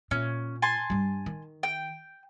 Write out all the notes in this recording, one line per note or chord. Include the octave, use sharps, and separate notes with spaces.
A#2 C#4
G#5 A5 C6
G2 G3
D#3
G5